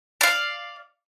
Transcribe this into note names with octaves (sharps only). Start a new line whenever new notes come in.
D5 F5